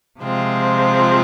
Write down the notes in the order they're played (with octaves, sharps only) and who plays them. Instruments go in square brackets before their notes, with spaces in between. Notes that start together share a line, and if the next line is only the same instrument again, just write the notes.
[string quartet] C3 F3 G#3 C4 F4